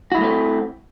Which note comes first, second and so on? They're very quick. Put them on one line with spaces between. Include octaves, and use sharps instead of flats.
F#4 E4 G#3 A3 C4